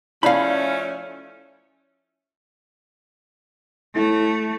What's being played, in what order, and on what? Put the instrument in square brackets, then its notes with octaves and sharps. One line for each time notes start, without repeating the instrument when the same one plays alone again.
[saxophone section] F3 A3 C#4 [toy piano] E4 D5 [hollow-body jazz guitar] F5 B5
[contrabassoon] A2 [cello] A3